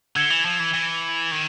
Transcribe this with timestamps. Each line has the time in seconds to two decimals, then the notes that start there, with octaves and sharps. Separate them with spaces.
0.15 D3 E6 G#6 C#7 E7 G7
0.30 E3
0.45 F3
0.60 E3
0.74 E3
1.32 D#3